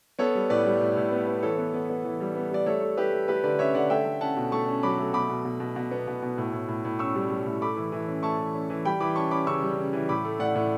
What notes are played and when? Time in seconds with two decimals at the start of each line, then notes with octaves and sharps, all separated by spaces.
0.19 B3 A4 C#5
0.35 G3
0.50 A2 B4 D5
0.65 G3
0.81 A2
0.97 A2
1.12 B3
1.27 B3
1.42 E3 A4 C#5
1.58 B3
1.74 B3
1.90 B3
2.04 E3
2.20 G3
2.35 B3
2.51 G3 D5
2.66 A3 A4 C#5
2.81 A3
2.97 A3 G4 B4
3.13 A3
3.28 A3 G4 B4
3.44 D3 B4 D5
3.59 C#4 C#5 E5
3.75 D3 D5 F#5
3.90 A3 E5 G5
4.05 A3
4.21 C#4 F#5 A5
4.37 B2
4.52 A3 A5 C#6
4.68 C#4
4.83 F#3 B5 D6
4.99 A3
5.13 B2 B5 D6
5.29 B2
5.45 B2
5.60 B2
5.76 B2
5.91 B3
6.07 B2
6.22 B2
6.38 A2
6.53 A2
6.69 A2
6.85 A2
6.99 C#4 C#6 E6
7.15 G3
7.30 G3
7.46 A2
7.61 A3 B5 D6
7.76 E3
7.92 E3
8.08 C#4
8.23 A3 A5 C#6
8.38 E3
8.55 C#4
8.70 E3
8.85 G3 G5 B5
9.00 E3 B5 D6
9.15 C#4 A5 C#6
9.31 C#4 B5 D6
9.47 C#3 C#6 E6
9.62 G3
9.78 C#3
9.93 E3
10.09 A2 B5 D6
10.24 A3
10.39 A2 D5 F#5
10.55 A2